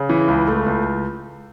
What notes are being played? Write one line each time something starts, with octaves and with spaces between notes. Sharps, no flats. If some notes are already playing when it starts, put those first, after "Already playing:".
Already playing: C#3
E3
C#2
A3
C#2